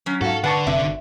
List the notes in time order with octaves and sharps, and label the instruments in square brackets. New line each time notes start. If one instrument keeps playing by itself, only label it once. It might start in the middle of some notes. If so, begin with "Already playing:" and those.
[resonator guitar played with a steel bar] F#3 C#4
[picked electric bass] G#2 [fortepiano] F#4 F5 [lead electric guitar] A4
[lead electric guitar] D3 [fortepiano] B4 A5 C#6 [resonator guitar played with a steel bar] F#5
[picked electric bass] F#1 C3 D4 [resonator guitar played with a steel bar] E5
[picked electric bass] G#1